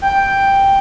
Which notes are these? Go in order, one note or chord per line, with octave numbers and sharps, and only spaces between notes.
G5